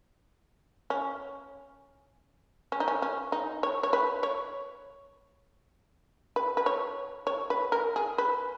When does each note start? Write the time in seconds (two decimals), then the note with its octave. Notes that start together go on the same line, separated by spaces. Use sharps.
0.90 C#4
2.72 C#4
2.80 D#4
2.88 C#4
3.02 C#4
3.32 D#4
3.63 C#5
3.83 C#5
3.93 B4
4.23 C#5
6.36 B4
6.57 B4
6.66 C#5
7.27 C#5
7.50 B4
7.72 A#4
7.96 G#4
8.18 B4